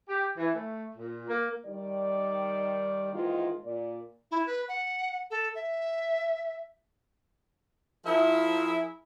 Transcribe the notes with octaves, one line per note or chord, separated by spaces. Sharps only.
G4
E3
A3
A#2
A#3
D#3 G3 D5
G#2 D#3 E3 G#3 A#3 F4
A#2 D5
E4
B4
F#5
A4
E5
F3 E4 G#4 A#4 E5